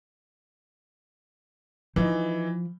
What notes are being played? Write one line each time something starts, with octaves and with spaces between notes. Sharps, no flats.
E3 F3 D#4